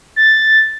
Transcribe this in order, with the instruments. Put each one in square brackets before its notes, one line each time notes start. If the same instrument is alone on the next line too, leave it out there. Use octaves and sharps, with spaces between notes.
[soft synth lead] A6